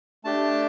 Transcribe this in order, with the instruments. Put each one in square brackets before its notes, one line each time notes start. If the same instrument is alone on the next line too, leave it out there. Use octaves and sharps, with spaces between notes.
[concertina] A3 D4 G4 A5